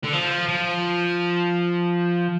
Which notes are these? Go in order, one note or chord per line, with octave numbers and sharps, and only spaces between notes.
D3
F3
F3